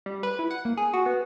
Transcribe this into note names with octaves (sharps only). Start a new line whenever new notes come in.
G3
B4
E4
F#5
A#3
G#4
F#4
B3